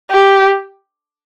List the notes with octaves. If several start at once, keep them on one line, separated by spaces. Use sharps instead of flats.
G4